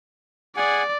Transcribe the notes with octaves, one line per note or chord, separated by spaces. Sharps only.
G#4 D5 F#5 G#5